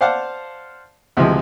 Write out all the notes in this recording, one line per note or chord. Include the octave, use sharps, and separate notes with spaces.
C5 D5 F5 F#5 A5
D2 C3 E3 F3 G#3